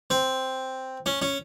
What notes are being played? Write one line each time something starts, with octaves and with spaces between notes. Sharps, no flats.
C4
C#4
C#4